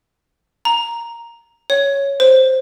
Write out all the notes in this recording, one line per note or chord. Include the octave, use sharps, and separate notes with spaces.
A#5
C#5
C5